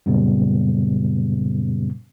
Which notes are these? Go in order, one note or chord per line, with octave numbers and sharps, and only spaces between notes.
F#2 A#2 C#3 G3 B3